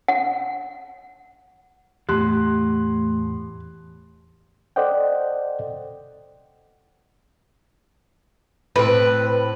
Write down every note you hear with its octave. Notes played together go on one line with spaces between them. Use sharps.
F#5
E2 A2 A3 G4 C6 F#6
A4 C5 D5 D#5 F#5 G5
A2 C4 B4